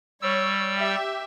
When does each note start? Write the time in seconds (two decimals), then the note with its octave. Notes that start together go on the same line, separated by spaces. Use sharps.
0.22 G3 C#5 E6
0.75 G4 E5